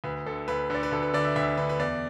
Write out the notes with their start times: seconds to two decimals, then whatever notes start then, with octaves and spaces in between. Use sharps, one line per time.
0.04 D2 B4
0.26 D3 A4
0.48 D2 B4
0.70 D3 D5
0.83 B4
0.92 D2 A4
1.02 B4
1.14 D3 D5
1.24 E5
1.36 D2 E5
1.57 D3 B4
1.69 B4
1.79 E2 D5